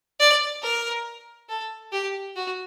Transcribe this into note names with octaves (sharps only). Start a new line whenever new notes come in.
D5
A#4
A4
G4
F#4